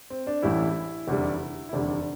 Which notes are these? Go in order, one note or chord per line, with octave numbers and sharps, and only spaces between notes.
C4
D4
A1 A2 E3 G3 E4
F1 E2 D3 G3
E4
F1 E2 D3 G3 D4